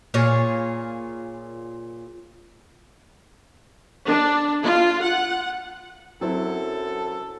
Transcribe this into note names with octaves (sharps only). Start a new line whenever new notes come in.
A#2 F4 G#4 C#5
D4
F4
F#5
F#2 F#3 C4 E4 A4